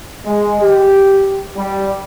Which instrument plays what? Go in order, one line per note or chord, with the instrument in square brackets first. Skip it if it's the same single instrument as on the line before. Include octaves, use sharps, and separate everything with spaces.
[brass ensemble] G#3
G4
G3